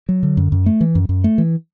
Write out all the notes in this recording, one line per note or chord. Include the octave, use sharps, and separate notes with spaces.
F#3
D3
F#2
F#2
A3
E3
F#2
F#2
A3
E3